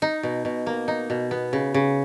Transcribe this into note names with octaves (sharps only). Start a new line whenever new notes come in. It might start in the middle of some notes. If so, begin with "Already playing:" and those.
D#4
B2
B2
A#3
D#4
B2
B3
C#3
C#3